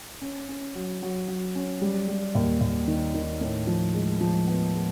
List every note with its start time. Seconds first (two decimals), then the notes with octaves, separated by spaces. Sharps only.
0.21 C#4
0.49 C#4
0.75 F#3
1.02 F#3
1.28 F#3
1.55 C#4
1.81 G3
2.08 G3
2.35 D#2
2.61 D#2
2.88 D#3
3.14 D#3
3.41 A2
3.67 F3
3.94 G#3
4.21 F3
4.47 B3
4.74 G#3